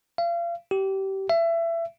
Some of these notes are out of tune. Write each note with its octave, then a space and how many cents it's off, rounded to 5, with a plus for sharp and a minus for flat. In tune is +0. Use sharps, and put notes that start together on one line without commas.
F5 -35
G4 -25
E5 +25